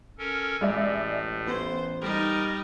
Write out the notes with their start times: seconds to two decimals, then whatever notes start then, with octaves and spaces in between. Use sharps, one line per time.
0.18 C#4 A4 A#4
0.61 A1 A2 G#3 D5 E5
1.47 B3 C5
2.01 G3 D#4 A#4